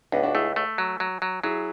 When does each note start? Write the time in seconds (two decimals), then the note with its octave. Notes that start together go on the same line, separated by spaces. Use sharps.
0.12 C#2 B3 D4
0.23 D4 F#4
0.34 A3 E4 G#4
0.56 A3
0.78 F#3
1.00 F#3
1.22 F#3
1.43 F#3 E4 G#4